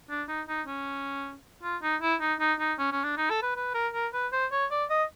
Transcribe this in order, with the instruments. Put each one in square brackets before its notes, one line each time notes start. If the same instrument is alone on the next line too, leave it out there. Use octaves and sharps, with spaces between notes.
[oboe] D4
D#4
D#4
C#4
F4
D#4
E4
D#4
D#4
D#4
C#4
C#4
D4
D#4
A4
B4
B4
A#4
A#4
B4
C5
C#5
D5
D#5